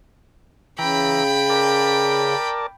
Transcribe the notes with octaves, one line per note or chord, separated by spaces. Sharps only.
C#3 E3 G5 A#5 B5
A#4 D5 A5